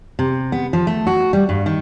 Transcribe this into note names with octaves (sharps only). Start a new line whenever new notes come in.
C3
B3
F3
A3
F#4
G3
G2
D#3